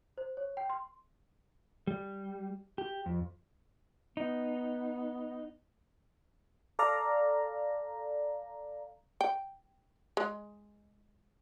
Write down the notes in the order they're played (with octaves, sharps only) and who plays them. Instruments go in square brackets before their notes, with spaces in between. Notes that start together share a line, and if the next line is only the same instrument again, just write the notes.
[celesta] C5
C#5
G5
C6
[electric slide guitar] G3
G4
F2
[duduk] B3 [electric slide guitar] D#4
[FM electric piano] A4 D5 F5 A#5
[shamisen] G5
G#3